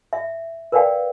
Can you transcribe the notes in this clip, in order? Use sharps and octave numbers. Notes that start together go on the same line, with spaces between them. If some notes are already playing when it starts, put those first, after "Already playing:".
E5
A#4 B4 D5 F5 G5